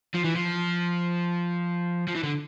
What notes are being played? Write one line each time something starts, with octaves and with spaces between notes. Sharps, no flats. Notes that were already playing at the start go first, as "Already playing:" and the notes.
F3
E3
F3
F3
E3
D3